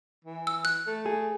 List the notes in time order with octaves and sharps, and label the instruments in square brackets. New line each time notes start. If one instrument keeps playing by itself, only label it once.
[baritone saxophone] E3
[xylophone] E6
F#6
[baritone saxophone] A3
[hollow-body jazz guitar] G#4